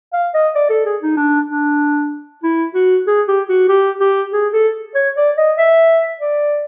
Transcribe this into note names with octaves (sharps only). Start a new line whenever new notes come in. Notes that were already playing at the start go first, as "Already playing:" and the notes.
F5
D#5
D5
A4
G#4
D#4
D4
D4
E4
F#4
G#4
G4
F#4
G4
G4
G#4
A4
C#5
D5
D#5
E5
D5